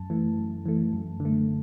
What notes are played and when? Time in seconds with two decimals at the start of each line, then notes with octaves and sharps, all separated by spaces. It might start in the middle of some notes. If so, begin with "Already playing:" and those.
Already playing: F#2 A5
0.10 E3 A3
0.38 F#2
0.66 E3 A3
0.93 F#2
1.20 D3
1.25 A3